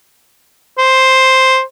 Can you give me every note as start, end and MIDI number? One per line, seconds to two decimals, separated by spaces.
0.78 1.61 72